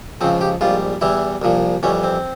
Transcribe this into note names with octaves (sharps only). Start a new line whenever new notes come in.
C#2 C#3 F3 C4
G4
A#1 G#2 G3 F4
E2 E3 G3 E4
C2 A#2 F3
F2 E3 G3 C#4
C4